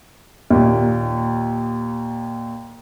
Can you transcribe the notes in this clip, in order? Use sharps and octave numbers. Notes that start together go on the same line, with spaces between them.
D#2 A#2